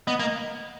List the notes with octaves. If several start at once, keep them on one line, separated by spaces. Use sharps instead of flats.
B3 D#5
A#3